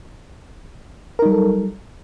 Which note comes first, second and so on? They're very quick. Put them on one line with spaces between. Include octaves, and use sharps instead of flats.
A#4 D#4 G3 F#3 A4